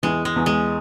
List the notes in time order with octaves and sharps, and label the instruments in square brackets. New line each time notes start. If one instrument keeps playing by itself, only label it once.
[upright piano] E2 E3 [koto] G#3
[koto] G#3
[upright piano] E2 E3
[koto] G#3